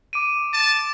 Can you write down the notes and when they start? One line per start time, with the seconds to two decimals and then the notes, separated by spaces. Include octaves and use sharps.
0.13 D6 D7 D#7
0.53 A5 D#7 E7